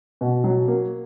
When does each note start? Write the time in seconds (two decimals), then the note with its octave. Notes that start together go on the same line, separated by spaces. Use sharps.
0.21 B2
0.44 F#3
0.68 A#3